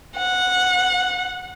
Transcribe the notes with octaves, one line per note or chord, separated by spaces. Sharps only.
F#5